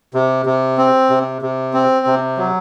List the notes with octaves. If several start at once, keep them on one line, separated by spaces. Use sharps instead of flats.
C3
C3
C4
C3
C3
C4
C3
F#3